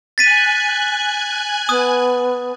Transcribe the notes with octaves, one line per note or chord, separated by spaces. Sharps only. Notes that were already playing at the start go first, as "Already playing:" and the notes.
G#5 F#6 G#6 A6 B6 D#7
B3 D#6